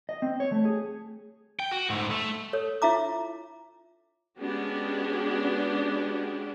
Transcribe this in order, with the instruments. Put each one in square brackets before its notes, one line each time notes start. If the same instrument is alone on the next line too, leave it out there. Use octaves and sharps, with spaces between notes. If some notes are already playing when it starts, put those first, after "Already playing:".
[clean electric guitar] D#5
C4
C#5
A3
G#4
[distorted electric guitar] G5
F#4
G#2 A3
A3
[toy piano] A4 C#5
E4 F4 E5 A#5 D6
[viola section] G#3 B3 C#4 D4 F#4 G4